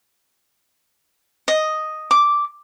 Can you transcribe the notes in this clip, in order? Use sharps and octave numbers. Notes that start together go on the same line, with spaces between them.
D#5
D6